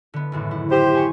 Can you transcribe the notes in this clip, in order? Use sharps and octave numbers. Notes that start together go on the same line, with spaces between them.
D3 B3
G#1 F#2 A2
E4
G4 C5
G#5 C#6